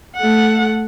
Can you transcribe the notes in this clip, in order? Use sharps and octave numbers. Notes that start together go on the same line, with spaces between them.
A3 F#5